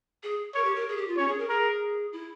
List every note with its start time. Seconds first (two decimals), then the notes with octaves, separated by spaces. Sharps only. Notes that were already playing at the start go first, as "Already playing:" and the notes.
0.23 G#4
0.54 A#4 C#5
0.64 G4
0.75 A#4
0.89 G#4
0.97 G4
1.07 F4
1.17 C#4 C#5
1.28 G#4
1.38 A#4
1.49 G#4 A#4
2.13 E4